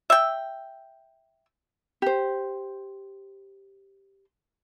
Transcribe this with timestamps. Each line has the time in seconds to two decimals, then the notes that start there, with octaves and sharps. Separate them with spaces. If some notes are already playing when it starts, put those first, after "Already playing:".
0.10 E5 G5
2.02 G4 C5